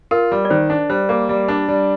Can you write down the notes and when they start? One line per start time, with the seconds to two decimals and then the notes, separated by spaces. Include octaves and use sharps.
0.11 F4 A#4
0.32 G3
0.45 D5
0.50 D#3 C5
0.70 D4
0.90 G3 C5
1.09 A#3
1.29 G3
1.48 D4
1.68 G3